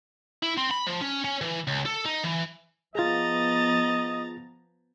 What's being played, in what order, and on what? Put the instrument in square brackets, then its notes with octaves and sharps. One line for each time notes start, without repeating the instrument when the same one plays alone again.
[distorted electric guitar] E4
C4
B5
F3
C#4
C#4
E3
C#2
A4
D#4
E3
[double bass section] F3 B3 [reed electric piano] F4 G#4 [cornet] D#5 [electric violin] A#5 A6